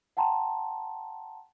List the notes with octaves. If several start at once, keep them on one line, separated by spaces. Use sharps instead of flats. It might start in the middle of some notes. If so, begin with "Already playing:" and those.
F#5 G5 A5 A#5 C6